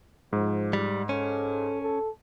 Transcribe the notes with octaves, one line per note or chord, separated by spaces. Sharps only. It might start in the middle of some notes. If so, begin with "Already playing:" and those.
G#2 F3
G3
C#4 A4
A4